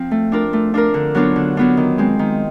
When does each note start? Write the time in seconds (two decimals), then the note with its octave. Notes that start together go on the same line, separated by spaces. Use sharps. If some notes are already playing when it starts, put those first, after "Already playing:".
Already playing: F3 C4
0.11 A3
0.32 D4 F4 A#4
0.53 A3
0.74 D4 F4 A#4
0.94 D3
1.14 F#3 B3 D4 F4
1.36 D3
1.57 F#3 B3 D4 F4
1.77 D#3
1.98 G#3 C4
2.19 D#3